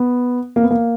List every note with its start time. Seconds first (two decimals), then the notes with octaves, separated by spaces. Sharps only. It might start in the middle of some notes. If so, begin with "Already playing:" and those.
Already playing: B3
0.56 A#3
0.63 B3
0.71 A#3